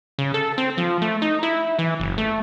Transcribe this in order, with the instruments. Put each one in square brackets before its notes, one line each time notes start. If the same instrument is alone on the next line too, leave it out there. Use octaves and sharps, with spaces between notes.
[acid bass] C#3
A4
C4
F3
A3
D#4
E4
E3
F#1
A3